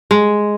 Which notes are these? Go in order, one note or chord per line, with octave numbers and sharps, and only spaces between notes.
G#3